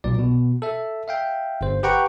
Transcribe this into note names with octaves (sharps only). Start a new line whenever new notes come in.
B1 A#2 D5
B2
A4 E5
E5 F5 G5
G1 C5
G4 B4 F#5 G5 A#5 C#6